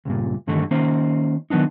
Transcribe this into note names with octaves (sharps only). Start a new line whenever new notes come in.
C#2 G2 A#2
G2 D3 D#3 A3
D#3 A#3 C#4 C5
D#3 F#3 B3 D4 D#4